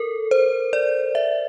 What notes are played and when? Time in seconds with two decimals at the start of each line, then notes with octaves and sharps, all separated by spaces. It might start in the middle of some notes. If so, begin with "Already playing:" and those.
Already playing: A4 A#4
0.31 C5
0.73 D5
1.15 E5